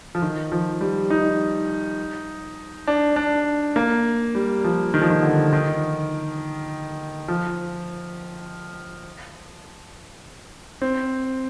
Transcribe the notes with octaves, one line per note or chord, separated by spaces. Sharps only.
F3
D#3
F3
G3
D#4
D4
D4
A#3
G3
F3
D#3
F3
D#3
D3
D#3
F3
C4